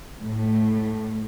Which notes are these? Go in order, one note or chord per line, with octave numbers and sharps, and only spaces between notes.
A2